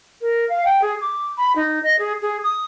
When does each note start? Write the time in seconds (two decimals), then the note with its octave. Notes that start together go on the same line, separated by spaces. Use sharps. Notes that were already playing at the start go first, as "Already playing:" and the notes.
0.21 A#4
0.49 F5
0.65 G5
0.82 G#4
1.01 D6
1.37 B5
1.55 D#4
1.83 D#5
1.99 G#4
2.21 G#4
2.43 D#6